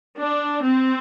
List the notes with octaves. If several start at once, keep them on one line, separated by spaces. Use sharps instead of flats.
D4
C4